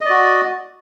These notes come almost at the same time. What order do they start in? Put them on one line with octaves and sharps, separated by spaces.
D#5 D5 F#4